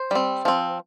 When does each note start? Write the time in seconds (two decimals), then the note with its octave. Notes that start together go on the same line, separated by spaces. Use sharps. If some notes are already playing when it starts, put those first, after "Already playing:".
Already playing: C5
0.11 G3 C4
0.45 F3 C4